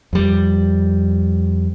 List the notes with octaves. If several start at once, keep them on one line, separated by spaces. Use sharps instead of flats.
F2 G3